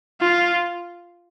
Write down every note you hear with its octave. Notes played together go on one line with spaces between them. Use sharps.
F4